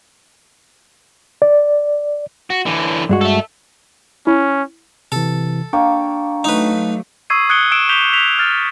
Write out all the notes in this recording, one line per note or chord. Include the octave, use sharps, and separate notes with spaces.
D5
F#4
D3 E3
G2 G#3 F#4
A4 E5
C#4 E4
C3 E3 A4
A#3 D4 G5 C#6
F#3 A3 D#4 B4
C#6 D#6 E6 G#6 C7 D#7
D#6 F#6 G#6 C#7 D7 G7
D#6 E6 D7 E7
D6 G6 B6 F7 G7
B6 F7
F6 A6